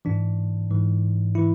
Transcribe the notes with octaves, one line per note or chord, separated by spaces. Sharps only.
G#2 E3 D4
G#2 E3
E3 E4